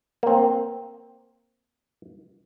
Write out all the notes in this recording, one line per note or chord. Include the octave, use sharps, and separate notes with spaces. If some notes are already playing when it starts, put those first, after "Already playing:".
A#3 C4